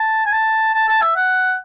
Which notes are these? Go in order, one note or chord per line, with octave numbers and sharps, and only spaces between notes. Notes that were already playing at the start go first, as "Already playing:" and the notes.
Already playing: A5
G#5
A5
A5
A5
E5
F#5